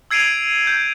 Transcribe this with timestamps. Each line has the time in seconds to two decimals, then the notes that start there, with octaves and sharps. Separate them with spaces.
0.11 E6 G#6 C7 D7 D#7 F7
0.67 G6